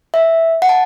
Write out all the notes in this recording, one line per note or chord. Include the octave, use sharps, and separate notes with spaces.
E5
F#5
A5